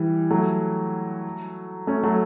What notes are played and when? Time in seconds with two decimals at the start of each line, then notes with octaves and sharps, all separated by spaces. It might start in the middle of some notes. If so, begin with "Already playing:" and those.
Already playing: E3 G3
0.30 F#3 A3
1.87 A3 C#4
2.03 F#3 A3